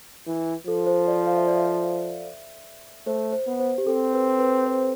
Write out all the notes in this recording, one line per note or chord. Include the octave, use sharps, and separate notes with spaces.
E3
F3 A4
C5
D5
F5
E5
D5
E5
A3 C5
C5
B3
C5
G4
C4 A4
B4
B4
C5